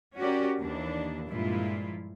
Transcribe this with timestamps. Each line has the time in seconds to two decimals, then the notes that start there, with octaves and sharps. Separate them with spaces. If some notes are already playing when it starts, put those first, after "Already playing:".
0.17 C#4 F#4 G4 A#4 D5
0.58 D#2 E3 D4
1.28 G2 A#2 F3 G#3 E4 F4